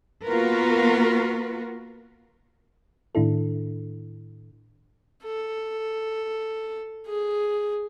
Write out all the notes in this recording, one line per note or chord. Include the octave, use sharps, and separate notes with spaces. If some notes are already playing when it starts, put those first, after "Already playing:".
A#3 B3 F4 F#4 A#4 B4
A2 D#3 D4 E4 A4
A4
G#4